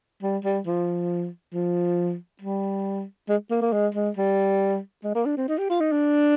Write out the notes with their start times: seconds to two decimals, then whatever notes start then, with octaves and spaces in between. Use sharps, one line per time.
0.22 G3
0.44 G3
0.66 F3
1.53 F3
2.41 G3
3.28 G#3
3.51 A#3
3.61 A#3
3.73 G#3
3.95 G#3
4.17 G3
5.04 G#3
5.15 A#3
5.26 D4
5.37 C4
5.48 D#4
5.58 G4
5.69 F4
5.80 D#4
5.91 D4